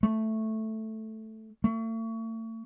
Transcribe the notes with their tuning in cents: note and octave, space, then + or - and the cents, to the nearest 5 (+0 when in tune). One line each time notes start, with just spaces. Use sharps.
A3 +0
A3 +40